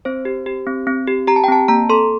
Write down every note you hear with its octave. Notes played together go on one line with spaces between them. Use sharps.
C4 C5
G4
G4
C4
C4
G4
G4 A#5
A5
G5
C4 A5
A#3 A#5
A4 C6